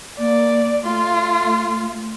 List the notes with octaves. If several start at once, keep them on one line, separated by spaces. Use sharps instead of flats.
A#3 D5
A3 F4